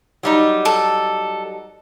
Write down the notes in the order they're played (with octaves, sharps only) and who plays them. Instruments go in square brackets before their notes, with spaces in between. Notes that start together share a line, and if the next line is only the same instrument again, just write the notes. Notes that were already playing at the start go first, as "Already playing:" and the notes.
[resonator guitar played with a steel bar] F#3 G3 D#4
[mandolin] A4